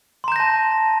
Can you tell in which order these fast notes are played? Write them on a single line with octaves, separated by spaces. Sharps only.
C6 A#5 G6 A#6 A5